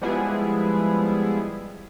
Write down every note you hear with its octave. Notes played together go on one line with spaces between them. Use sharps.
F3 G3 G#3 B3 E4 G#4